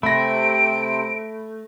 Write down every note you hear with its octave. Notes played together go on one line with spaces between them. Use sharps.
C3 A3 C4 B5 A#6 D7